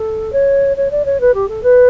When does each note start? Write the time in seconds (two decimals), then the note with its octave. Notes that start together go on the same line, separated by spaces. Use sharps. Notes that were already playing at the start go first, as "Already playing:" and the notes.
Already playing: A4
0.32 C#5
0.76 C#5
0.91 D5
1.05 C#5
1.20 B4
1.34 G4
1.48 A4
1.63 B4